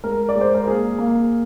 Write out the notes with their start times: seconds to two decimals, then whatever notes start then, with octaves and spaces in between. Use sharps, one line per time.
0.04 G#3 A#4
0.29 D5
0.35 G#3
0.41 C5
0.55 A#4
0.68 A#3 G#4
0.98 A#3